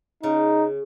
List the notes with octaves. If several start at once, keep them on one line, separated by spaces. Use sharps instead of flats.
C#3 D#4